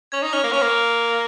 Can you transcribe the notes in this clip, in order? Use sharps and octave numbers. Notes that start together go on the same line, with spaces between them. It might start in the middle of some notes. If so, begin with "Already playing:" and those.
C#4 G#6
D#4
C#4 F6
A#3
C#4 F6
A#3